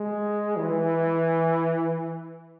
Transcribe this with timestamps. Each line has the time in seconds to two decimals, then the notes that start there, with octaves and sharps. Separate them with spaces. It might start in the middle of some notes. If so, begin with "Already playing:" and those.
Already playing: G#3
0.57 E3